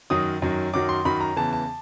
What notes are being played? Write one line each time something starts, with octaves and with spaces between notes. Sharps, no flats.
F#2 D#3 F#3 D#6
F#2 D#3 F#3
F#2 D#3 F#3 D6
C6
F#2 D#3 F#3 B5
A#5
E2 C#3 E3 A5
A5